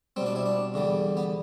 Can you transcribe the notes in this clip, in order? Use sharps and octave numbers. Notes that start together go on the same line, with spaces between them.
B2 G3 C4
D4
E4
D4
E2 D3 G3
B3